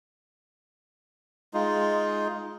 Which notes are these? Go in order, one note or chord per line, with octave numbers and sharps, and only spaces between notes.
G#3 D#4 F4